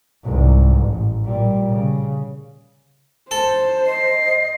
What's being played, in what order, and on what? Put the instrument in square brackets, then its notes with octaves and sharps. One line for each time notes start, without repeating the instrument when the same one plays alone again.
[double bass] C2 G#2
A1
A#2 G3
C#3
[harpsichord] A4 [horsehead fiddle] C5
[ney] D#5 [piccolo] C7